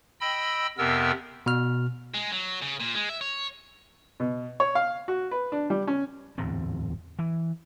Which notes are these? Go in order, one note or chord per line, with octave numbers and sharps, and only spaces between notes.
D#5 G5 B5 E6
F2 C3 B3 A#4 E6
B2 F6
G#3
F#3
C#3
A#2
G#3
E5
C#5
B2
C#5
F5
F#4
B4
D4
G3
C#4
D1 E2 G#2 C4
E3